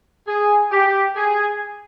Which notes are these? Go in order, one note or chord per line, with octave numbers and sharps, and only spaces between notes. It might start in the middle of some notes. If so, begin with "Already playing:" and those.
G#4
G4
G#4